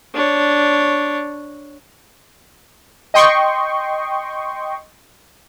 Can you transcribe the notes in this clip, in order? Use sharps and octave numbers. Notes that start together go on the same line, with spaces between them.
D4 C#5
D#5 G5 C6 C#6